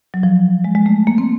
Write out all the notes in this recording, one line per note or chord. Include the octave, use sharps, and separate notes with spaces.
F#3
F3
G#3
G#3
A3
A#3
C4